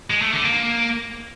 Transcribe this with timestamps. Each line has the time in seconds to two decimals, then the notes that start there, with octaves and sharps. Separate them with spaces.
0.10 G#3
0.22 A3
0.33 D3
0.45 A#3